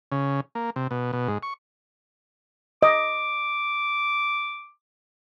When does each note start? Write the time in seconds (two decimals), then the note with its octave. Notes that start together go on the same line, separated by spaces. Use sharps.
0.12 C#3
0.55 A#3
0.76 C3
0.91 B2
1.13 B2
1.28 G#2
1.43 C#6
2.83 D#5 D6